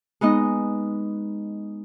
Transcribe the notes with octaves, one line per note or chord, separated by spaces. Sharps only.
G#3 B3 D#4 D#5